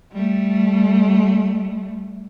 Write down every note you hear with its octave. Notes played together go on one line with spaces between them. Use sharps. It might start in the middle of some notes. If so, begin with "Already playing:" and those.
G3 A3